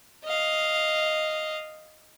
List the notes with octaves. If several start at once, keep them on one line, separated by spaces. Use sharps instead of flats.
D#5 F5